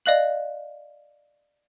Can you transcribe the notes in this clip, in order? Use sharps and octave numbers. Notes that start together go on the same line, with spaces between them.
D5 D#5 F5 F#6 F#7